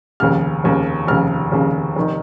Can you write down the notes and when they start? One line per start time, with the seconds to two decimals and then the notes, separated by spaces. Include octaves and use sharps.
0.20 F1 D#2 C#3 F6
0.64 F1 D#2 C#3
1.07 F1 D#2 C#3 F6
1.52 F1 D#2 C#3
1.96 F1 D#3